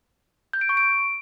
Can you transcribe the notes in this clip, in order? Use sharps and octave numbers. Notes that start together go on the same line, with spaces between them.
G6
D7
C#6
D7